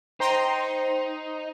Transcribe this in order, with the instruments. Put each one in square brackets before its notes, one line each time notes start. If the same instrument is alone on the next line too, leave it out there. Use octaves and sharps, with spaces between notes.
[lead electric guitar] D#4 [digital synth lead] C5 [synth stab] G5 A#5 C6